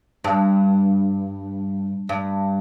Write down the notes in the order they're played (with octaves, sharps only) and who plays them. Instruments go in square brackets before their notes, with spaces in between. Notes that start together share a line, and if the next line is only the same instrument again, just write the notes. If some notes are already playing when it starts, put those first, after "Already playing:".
[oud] G2
G2